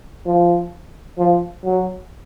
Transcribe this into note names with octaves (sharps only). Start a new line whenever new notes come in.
F3
F3
F#3